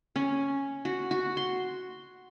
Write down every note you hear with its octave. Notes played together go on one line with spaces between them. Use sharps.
C#4
F#4
F#4
C6